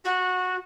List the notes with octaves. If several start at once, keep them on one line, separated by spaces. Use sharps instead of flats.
F#4